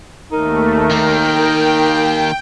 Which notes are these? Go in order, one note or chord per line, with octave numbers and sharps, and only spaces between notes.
D#2 A3 D#4 A#4
D#3 A#3 G5